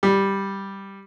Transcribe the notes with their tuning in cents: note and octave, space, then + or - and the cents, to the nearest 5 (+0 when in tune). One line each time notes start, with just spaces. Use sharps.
G3 +0